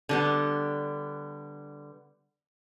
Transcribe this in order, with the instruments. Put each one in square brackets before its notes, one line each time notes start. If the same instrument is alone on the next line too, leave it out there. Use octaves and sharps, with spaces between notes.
[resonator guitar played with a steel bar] D3 G3 B3